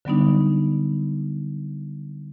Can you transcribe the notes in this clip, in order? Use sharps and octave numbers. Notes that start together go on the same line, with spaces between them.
D3 F#3 G3 B3 D4 D#4